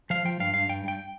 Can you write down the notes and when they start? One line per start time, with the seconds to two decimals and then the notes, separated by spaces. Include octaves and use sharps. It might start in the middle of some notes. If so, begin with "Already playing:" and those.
0.10 F3 F5
0.25 F3 G5
0.40 G2 F5
0.54 G2 F5
0.69 G2 G5
0.84 G2 G5